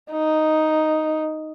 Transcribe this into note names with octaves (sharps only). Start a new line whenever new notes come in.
D#4